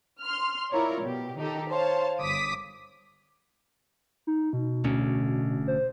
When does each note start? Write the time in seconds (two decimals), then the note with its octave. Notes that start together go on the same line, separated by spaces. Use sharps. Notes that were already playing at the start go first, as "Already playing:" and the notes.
0.21 C6 F6
0.71 E4 F4 A#4 C#5 D5
1.02 B2 G4
1.37 D#3 D#4 G4 A4
1.70 C5 C#5 F5 A5
2.20 G1 D6 D#6 B6
4.27 D#4
4.53 B2
4.84 D1 D2 C#4
5.68 C5